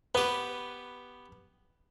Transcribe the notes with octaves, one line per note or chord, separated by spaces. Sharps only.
B3 G4 B4